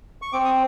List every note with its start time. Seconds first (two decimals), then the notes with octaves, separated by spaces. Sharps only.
0.22 C#6
0.33 C4 D6
0.45 D#6